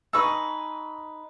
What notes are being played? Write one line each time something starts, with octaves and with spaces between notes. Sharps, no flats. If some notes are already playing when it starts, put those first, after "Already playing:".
D#4 G#4 B4 C#6 E6